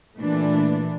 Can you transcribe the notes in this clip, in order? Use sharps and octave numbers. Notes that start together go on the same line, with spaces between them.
A#2 E3 A3 D4